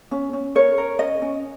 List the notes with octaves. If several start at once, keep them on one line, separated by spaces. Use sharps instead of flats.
C#4
C#4
A#4 C#5
A#4
C#4 D#5
C#4